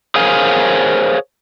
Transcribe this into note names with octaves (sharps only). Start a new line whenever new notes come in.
G#4 A#4 C5 C#5 F5 G#5